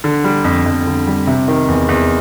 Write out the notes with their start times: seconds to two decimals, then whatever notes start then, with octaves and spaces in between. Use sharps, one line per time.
0.04 D3
0.24 G3
0.44 F2
0.66 F2
0.86 D3
1.07 G3
1.27 C3
1.48 D#3
1.68 E2
1.89 E2